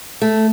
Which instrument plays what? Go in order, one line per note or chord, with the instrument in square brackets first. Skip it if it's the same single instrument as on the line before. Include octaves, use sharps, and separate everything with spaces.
[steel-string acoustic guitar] A3